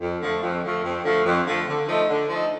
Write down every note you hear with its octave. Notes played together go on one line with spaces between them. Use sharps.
F2
D3 F3 A3
F2
D3 F3 A3
F2
D3 F3 A3
F2
D3 F3 A3
D3
F3 A3 D#4
D3
F3 A3 D#4